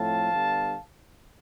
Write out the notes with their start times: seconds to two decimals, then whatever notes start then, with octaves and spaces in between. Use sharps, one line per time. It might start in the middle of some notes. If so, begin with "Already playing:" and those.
Already playing: A2 F3 A3 C4 F5 A5
0.31 D3 G3 B3